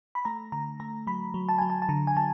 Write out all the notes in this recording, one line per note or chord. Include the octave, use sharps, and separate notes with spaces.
B5
A3 A#5
D3 A#5
A3 A#5
F#3 B5
F#3
A5
F#3 G#5
A5
A5
D3 A#5
G#5
F#3 A5